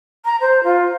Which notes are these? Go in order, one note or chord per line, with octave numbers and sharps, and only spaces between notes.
A#5
C5
F4